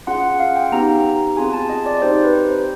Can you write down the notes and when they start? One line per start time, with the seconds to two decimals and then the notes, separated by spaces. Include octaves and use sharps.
0.07 C#4 F4 G#4 F#5
0.23 F#5
0.40 F5
0.56 G5
0.72 B3 D#4 G4 A#5
1.37 C4 F4 G#4 G#5
1.53 A5
1.70 D#5
1.86 D5
2.02 C4 D#4 G4 C5
2.24 B4
2.45 C5